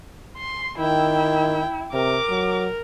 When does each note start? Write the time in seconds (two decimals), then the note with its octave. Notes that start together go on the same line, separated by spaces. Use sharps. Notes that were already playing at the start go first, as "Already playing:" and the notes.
0.37 C6
0.79 D#3 E4 G5
1.93 C3 A#4 D6
2.29 F#3